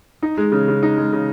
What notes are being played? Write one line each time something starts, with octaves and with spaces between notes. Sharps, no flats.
D#4
G#3
C#3
C#3
D#4
G#3
C#3